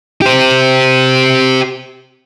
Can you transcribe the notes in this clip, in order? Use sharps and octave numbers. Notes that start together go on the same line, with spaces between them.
G4 C5